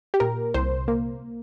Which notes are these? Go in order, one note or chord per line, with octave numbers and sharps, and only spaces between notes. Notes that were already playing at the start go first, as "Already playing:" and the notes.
G4
A#2 A#4
C2 C5
A#3